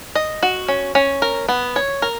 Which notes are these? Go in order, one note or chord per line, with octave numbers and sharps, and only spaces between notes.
D#5
F#4
C#4
C#4
A#4
B3
C#5
A#4